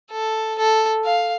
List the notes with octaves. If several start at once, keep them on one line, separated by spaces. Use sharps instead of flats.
A4
A4
F5